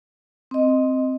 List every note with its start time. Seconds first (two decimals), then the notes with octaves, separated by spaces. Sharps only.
0.51 C4 D#5